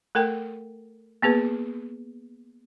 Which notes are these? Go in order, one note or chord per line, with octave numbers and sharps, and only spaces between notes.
A3 A4 A#4 G5
A#3 B3 G#4 B4